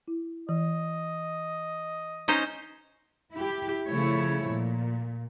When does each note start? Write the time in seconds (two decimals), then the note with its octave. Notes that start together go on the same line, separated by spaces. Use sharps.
0.08 E4
0.49 E3 D#5
2.28 C#4 D#4 C5
3.32 E4 G4
3.88 C#3 F3 A3 E4 C#5
4.49 A#2